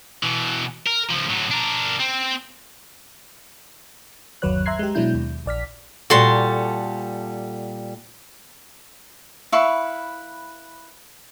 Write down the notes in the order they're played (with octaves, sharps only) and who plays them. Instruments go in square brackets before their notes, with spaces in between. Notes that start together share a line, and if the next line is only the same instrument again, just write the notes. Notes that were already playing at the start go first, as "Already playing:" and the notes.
[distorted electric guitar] B2 E3
A#4
C#2 F3
A2 F#3
D4 A#4
C4
[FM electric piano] G1 D#2 F#3 B4 C#5 F#6
E5 A#5 C6 F#6 G#6 C7
G#3 G4
B2 F#3 G#3 D4 E4 G6
D#2
A#1 D5 F6 B6
[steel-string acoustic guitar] A#2 G3 A4 [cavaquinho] F#4 A5 C6
[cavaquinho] E4 B4 F5 C#6